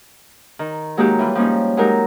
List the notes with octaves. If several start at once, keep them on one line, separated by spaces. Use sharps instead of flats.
D#3
F#3 G#3 A#3 D#4 F#4 G4
E3 G3 F4
F3 G3 A#3 C#4 D#4
F#3 G#3 D#4 G4 A#4